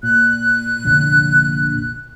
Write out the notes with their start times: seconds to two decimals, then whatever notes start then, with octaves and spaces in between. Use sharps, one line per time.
0.03 A#2 F#6
0.85 F1 A#1 D3